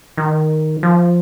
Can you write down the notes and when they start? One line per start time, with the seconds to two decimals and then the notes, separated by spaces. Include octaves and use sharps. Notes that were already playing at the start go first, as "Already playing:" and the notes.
0.17 D#3
0.83 F3